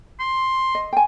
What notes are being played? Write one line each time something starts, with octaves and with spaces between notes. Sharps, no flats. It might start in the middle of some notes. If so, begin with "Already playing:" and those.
C6
D#5
G5 G#5